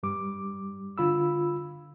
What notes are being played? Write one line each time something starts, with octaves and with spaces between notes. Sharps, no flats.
G2 G3 D6
D3 F4 B5 E6